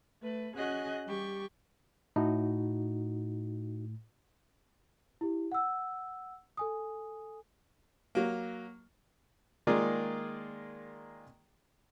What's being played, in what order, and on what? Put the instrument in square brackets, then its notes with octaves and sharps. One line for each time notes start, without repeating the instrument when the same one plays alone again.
[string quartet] A3 B4
C#4 F#4 G#4 D#5 F#6
G3 G4 C#6
[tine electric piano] A2 [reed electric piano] D#4 F#4
[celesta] E4 G4
F#5 E6
A4 G#5 D#6
[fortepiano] F#3 A#3
D#3 G#3 A#3 F4 G#4 D5